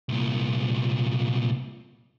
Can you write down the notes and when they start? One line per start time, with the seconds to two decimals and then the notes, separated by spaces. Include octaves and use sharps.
0.09 C2 A#2